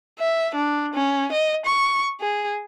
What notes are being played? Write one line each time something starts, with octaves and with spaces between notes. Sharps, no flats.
E5
D4
C#4
D#5
C#6
G#4